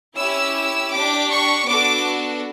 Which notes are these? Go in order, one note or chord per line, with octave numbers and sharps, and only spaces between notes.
C#4 E4 G4 E6
D4 G4 D6
C#6
B3 D4 F#4 A4 D6